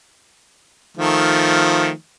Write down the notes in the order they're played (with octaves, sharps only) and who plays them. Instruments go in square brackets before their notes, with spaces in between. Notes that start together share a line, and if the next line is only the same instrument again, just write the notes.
[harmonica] D#3 F3 A3